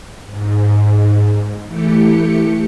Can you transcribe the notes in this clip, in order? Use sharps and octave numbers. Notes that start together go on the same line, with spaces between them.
G#2
E3 A3 G4 C#7